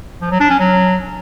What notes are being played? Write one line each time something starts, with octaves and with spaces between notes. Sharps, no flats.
F3
F#3
D4
C#4
F#3